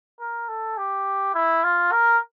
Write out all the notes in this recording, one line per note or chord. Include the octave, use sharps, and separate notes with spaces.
A#4
A4
G4
E4
F4
A#4